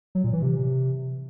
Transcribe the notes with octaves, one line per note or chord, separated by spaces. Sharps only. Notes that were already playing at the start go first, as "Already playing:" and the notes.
F#3
A#2
E3
C3